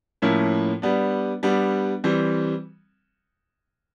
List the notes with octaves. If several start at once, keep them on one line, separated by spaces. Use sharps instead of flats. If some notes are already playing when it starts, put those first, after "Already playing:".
A2 F3 A#3 C#4 E4
G3 B3 D4
G3 B3 D4
E3 G3 C4